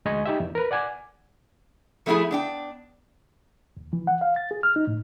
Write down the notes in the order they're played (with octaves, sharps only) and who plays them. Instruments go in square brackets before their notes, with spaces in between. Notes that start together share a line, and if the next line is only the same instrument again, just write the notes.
[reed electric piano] D2 G#3 D#5 G#5 C#6
D#4 G4 E5
E2
A#4 B4
D5 F#5 G#5 D6
[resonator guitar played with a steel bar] F3 A3 B3 D#4 E4 G#4
B3 D4 G5
[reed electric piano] D#2
E3
F#5
F5
A6
G#4
F6
D#4
A2